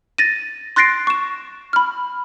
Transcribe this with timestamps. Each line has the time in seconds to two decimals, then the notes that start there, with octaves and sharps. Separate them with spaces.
0.18 A6 A#6 D#7
0.76 C6 F#6 A6 A#6 C7 D7
1.07 C#6 E7
1.73 B5 F6